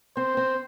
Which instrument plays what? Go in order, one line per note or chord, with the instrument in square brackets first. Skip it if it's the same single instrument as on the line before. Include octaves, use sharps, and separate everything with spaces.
[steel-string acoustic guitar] C4 [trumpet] C5
[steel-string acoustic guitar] C4